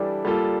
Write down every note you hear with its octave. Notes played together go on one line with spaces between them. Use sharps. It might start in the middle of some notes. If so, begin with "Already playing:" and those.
Already playing: E3 G3 D4 A4
G3 A#3 F4 A4